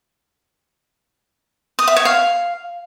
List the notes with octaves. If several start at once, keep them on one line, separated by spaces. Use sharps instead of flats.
D#6
E5
C#5
F5